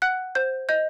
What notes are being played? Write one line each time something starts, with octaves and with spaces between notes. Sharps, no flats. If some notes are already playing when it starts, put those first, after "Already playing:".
F#5 F#6
C5 G6
D#5 G6